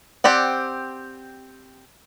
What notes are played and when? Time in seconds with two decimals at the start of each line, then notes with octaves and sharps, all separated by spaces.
0.24 C4 G4 D5 F#5